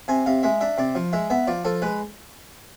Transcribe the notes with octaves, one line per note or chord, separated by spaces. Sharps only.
C3 G#5
C3 F5
G#3 E5
D4 E5
C3 D5
F3
G#3 E5
B3 E5
F3 D5
F3 A4
G#3 B4